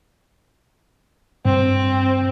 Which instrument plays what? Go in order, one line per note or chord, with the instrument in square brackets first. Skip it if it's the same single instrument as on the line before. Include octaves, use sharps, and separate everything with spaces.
[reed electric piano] G2 [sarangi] C4